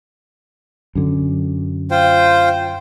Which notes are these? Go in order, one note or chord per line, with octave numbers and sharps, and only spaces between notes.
F#2 D3
F4 C5 G5